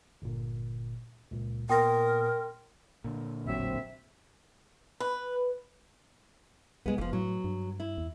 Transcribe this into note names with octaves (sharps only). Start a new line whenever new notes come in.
G1 A#2
C#2 A#2
A#2 B3 A#4 G5 C6 D#6 A#6
A#2 D3
E1 A1 F#3 C4 E5
B4
C2 G#3 B3
F1 E3 F3
A2 F#3
G2
E4
E2